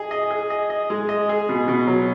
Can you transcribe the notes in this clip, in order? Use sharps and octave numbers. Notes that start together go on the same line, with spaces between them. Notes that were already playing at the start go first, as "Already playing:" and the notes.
Already playing: G#4 D#5
D#5
G#4
D#5
D#5
G#3
D#5
G#4
B2
B2
F#3